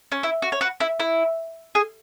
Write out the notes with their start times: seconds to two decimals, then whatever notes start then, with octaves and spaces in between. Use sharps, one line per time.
0.12 C#4
0.23 E4
0.42 F#4
0.52 C#5
0.61 F#4 B4
0.80 E4
1.00 E4
1.75 G#4